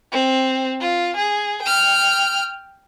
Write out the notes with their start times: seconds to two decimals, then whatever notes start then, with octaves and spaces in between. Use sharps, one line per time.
0.12 C4
0.81 F4
1.16 G#4
1.62 G5 F6